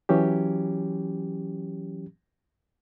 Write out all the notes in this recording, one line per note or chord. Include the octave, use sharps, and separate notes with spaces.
E3 F#3 C#4 G4